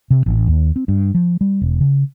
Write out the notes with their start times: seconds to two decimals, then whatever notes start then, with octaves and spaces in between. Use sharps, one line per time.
0.10 C3
0.26 A1
0.47 D#2
0.76 C4
0.88 G2
1.14 F3
1.41 G3
1.61 E1
1.81 C#3